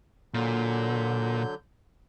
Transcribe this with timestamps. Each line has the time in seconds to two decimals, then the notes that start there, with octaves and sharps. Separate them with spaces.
0.34 A#2 D3 F#3 G6